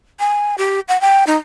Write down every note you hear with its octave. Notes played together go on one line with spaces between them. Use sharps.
G#5
G4
F#5
G5
D#4